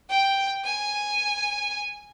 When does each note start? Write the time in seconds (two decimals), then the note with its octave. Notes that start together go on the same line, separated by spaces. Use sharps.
0.09 G5
0.64 G#5